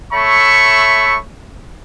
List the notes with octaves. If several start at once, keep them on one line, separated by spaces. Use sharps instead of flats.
A3 C#5 E5 B5 C#6